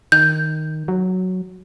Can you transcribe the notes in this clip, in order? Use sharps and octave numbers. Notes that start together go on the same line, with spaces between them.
D#3 G6
F#3